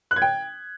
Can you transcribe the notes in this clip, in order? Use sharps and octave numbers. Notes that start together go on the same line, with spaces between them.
F#6
G#6
G5